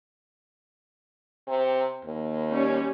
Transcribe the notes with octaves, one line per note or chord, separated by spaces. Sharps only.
C3
D#2
G3 C#4